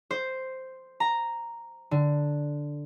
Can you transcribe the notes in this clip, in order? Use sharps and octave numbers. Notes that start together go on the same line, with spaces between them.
C5
A#5
D3